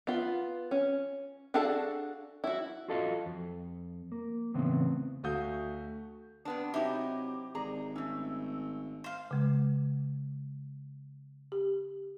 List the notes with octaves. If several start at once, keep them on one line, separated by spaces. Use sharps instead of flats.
B3 F4
C#4
D4 F#4 G#4 A4 F5
E4 F#4
F4 F#4 A4 D#5 F5
F2
A#3
E2 A2 C#3 B3 C4
D2 A3 F#4 F5 D#6 G6
C3 B3 D4 D#6
C3 F#3 D#4 E4 G4 D6
G#1 G#4 D5 A#5
A3 C#4 E6
C5 F5
C#3 G#3
G4